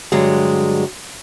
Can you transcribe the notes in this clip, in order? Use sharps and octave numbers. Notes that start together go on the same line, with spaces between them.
G2 D3 F#3 G#3